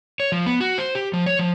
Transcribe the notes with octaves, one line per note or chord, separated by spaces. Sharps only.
C#5
F3
B3
F#4
C5
G4
F3
C#5
F3